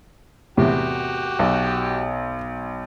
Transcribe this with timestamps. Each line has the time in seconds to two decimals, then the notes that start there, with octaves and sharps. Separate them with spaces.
0.57 E2 A2 C3 F#4 G4
1.39 B1